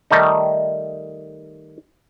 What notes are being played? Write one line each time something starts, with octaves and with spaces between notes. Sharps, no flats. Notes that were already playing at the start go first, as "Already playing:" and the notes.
D#3 G3 A3 D#4